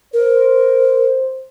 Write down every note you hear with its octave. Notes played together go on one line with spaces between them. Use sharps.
A#4 C5